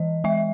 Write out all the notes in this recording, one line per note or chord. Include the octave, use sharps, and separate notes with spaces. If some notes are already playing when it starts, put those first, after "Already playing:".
Already playing: E3 D#5
G#3 E5